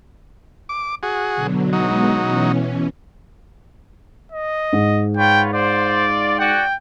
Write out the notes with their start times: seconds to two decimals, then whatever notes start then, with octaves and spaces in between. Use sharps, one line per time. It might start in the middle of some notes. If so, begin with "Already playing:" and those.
0.69 D6
1.03 F#4 G#4
1.34 B2 D3 F#3
1.73 F#3 G#3 B3 D#4
2.21 B2 E3 C#4
4.32 D#5
4.73 G#2
5.17 F4 B4 C#5 G5
5.53 F4 C5 D5
6.40 F#4 D5 F#5 G5